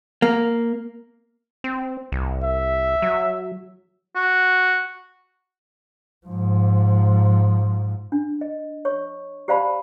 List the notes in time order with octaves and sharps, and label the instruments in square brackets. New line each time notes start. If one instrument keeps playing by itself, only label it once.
[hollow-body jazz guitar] A#3
[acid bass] C4
C2
[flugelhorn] E5
[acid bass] F#3
[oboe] F#4
[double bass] G#2 F3
[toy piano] D4
D#5
C#5 C#6
G4 C5 D5 F5 A5 B5